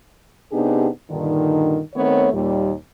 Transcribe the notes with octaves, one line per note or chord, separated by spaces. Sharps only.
C3 B3 D4 D#4 G4 G#4
G2 A#2 D3 D#3
D#3 A3 B3 C4 C#5
D#2 A#2 G3